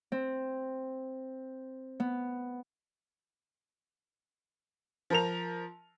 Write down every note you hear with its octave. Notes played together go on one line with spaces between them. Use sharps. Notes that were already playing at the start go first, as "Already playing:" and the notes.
C4
B3
F3 A#4 F7